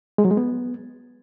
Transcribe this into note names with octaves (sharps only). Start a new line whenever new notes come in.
G#3
F#3
G#3
B3